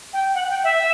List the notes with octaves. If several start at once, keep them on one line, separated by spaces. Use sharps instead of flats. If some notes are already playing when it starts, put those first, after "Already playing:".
G5
F#5
G5
E5